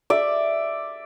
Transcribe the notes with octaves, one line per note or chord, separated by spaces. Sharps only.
D5 E5